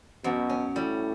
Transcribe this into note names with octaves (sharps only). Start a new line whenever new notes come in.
F#2 B2
C#4
A2 G3